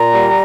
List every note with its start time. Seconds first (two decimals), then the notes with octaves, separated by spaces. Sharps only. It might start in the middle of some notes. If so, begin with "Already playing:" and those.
Already playing: A#2 A#5
0.12 G3